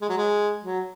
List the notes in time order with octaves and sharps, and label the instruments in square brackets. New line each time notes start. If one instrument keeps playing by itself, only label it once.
[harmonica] G#3
F#3
G#3
F#3